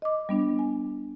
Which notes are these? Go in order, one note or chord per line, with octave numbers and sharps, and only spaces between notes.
D#5 D6
G3 B3 D4
G#5